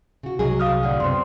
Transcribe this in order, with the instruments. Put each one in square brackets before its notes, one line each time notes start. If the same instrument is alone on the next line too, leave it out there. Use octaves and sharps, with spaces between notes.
[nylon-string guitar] C#3 F#4
[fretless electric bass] C2 [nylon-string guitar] F#3 G#3 G#4
[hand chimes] F5 D#6 F6
[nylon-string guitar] A2 D3 [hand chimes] D5 F#5 F6
[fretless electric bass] F#2 C3 F#3 [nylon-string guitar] B3 C4 [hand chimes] C6